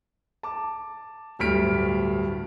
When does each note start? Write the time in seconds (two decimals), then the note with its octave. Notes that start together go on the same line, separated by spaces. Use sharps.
0.43 A5 D6
1.39 D1 D2 G2 F6 B6 D7